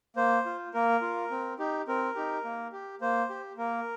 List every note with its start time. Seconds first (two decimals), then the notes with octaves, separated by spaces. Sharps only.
0.16 A#3 C5
0.46 F4
0.74 A#3 A#4
1.02 F4
1.31 C4
1.59 D#4 G4
1.88 C4 A#4
2.15 D#4 G4
2.45 A#3
2.73 G4
3.01 A#3 C5
3.30 G4
3.58 A#3 A#4